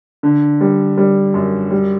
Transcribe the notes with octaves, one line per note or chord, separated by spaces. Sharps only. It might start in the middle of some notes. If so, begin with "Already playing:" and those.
D3
G3
G3
F#2
G3